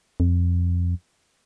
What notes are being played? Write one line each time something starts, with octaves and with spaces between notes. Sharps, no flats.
F2